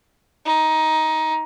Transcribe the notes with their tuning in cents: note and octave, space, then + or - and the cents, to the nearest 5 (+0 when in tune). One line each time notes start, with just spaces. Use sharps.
D#4 +15